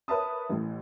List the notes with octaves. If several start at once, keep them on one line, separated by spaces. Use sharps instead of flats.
A#4 B4 C#5 E5 A5 D#6
A1 A2